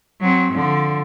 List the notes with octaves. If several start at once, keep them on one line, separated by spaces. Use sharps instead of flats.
F#3 C4
D3 F3